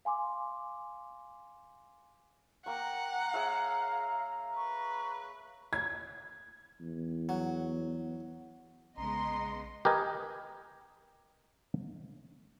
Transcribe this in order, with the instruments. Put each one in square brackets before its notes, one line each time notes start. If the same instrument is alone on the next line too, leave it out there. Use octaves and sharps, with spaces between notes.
[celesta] F5 G#5 C6 D6
[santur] A#3 C#6 [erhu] F#5 [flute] G5 [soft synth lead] A#5
[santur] G#4 C#5 E5 [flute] F5
[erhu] B4 [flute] C#6
[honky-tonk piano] G#6
[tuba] E2
[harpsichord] F#3
[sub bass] A#1 [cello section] C#3 G#3 B3 [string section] D#5 C6 [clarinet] A#5
[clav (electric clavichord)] G4 A#4 B4 D#5 G#5